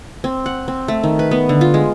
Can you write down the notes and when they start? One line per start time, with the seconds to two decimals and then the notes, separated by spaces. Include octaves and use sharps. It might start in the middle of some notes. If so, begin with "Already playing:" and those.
0.24 C4
0.46 F#5
0.68 C4
0.88 A3
1.03 D#3
1.19 B4
1.31 B3
1.49 D3
1.61 F4
1.74 G#3